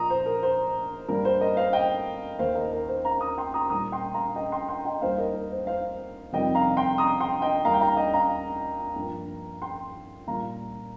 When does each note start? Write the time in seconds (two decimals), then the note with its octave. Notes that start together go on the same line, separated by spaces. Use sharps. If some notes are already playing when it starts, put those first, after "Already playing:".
Already playing: A#2 F3 A#3 A#5 D#6
0.10 C5
0.26 A#4
0.43 C5
1.08 G2 G3 A#3 A#4
1.25 C5
1.41 A#4 D#5
1.57 C5 F5
1.73 D#5 G5
2.39 D#2 D#3 A#3 C5 F5
2.55 A#4 D#5
2.72 A#4
2.88 C5
3.05 F5 A#5
3.21 A#5 D#6
3.38 G5 C6
3.54 A#5 D#6
3.70 A#2 G3 A#3 A#5 D#6
3.92 G5 C6
4.14 F5 A#5
4.36 D#5 G5
4.52 G5 C6
4.68 G5 C6
4.85 D#5 G5
5.01 D#2 D#3 G3 A#3 C5 F5
5.18 A#4 D#5
5.34 A#4
5.52 C5
5.67 C5 F5
6.33 F2 C3 D#3 G3 D#5 G5
6.55 F5 A#5
6.77 G5 C6
6.98 A#5 D#6
7.20 G5 C6
7.42 D#5 G5
7.65 D#2 D#3 G3 F5 A#5
7.74 G5
7.81 F5 A#5
7.97 D#5 G5
8.14 F5 A#5
8.96 G2 F3 A#3
9.62 G5 C6
10.27 A#2 G3 A#3 F5 A#5